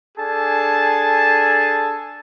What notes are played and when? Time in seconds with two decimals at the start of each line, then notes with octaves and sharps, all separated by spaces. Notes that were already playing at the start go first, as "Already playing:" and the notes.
0.18 D4 G#4 A4 G#5 A5